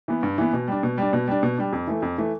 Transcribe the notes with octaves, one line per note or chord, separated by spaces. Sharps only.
E3 B3
G2
E3 B3
B2
G3 D4
B2
G3 D4
B2
G3 D4
B2
G3 D4
F2
E3 A3
F2
E3 A3